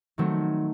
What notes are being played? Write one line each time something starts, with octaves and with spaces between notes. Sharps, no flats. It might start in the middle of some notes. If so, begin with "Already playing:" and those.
D#3 F#3 A3 C4